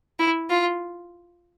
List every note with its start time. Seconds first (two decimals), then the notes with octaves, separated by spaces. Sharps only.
0.19 E4
0.50 F4